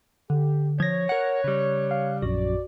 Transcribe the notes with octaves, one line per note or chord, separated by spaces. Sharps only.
D3 G4
F3 C#5 G#6 A#6
A#4 F#5 F#6
C#3 G3
F5
A#1 F#2 F#4 D5